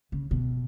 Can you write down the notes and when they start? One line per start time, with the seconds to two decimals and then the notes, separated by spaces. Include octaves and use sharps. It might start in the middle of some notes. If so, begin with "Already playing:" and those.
0.12 C#3
0.31 B2